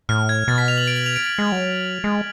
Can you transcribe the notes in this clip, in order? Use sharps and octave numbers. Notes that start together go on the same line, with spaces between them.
A2 F6
G#6
B2 A6
B6
F7
F#7
D7
F#7
F7
D7
D7
G#3
F#3
G#3